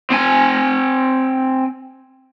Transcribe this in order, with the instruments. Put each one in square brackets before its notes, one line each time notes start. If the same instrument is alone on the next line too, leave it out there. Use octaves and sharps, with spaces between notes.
[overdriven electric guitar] C4 G#5